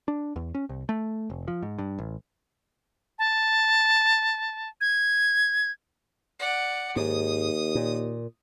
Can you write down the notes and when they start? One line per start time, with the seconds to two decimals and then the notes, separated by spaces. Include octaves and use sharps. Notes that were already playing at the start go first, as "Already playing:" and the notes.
0.08 D4
0.36 E2
0.55 C#4
0.69 C2
0.89 A3
1.30 F1
1.48 F3
1.62 G#2
1.79 G2
1.98 A1
3.19 A5
4.81 G#6
6.39 D5 F#5
6.96 D#2 G#2 D#6
7.75 A#2